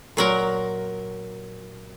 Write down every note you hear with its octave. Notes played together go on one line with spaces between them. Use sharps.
A#2 F#3 A#4